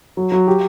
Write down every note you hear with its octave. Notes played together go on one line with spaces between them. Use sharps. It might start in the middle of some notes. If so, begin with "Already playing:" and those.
F#3
F#3
G4